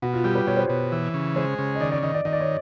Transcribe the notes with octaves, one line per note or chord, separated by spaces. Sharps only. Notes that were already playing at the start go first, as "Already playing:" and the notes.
B2 F#4
F4
G3 G4
B4
B2 C#5
C5
B2 C#5
E3
C#3
G#3 C5
C#3
D#5
D#3 D5
D5
D#3 D#5
D5
D#3 D#5
D5
C#5